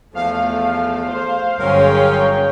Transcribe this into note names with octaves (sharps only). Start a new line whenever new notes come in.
E2 F3 A3 F5
C5
G1 F#3 C#4 G#4 A#4 C#5 G5 C6